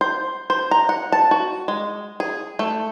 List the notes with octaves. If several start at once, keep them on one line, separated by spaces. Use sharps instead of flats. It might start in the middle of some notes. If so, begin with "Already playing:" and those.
C5
C5
A#5
F#5
A5
F#4
G#3
G#4
A3